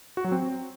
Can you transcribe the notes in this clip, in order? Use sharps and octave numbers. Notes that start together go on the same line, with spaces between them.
F#4
F#3
C4